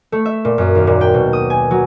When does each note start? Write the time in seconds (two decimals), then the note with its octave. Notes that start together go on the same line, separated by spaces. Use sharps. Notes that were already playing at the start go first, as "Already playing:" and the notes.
0.12 A3
0.26 E5
0.45 A#2
0.58 F#2
0.75 D#2
0.87 A#2
1.01 G5
1.14 B2
1.33 D#6
1.50 G#5
1.71 F#3